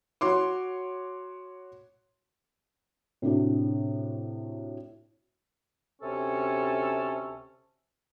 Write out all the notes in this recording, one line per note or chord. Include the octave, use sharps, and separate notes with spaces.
F#4 C#5 C6 D6
A2 C3 A3 D4 F#4
D2 C3 C#4 A4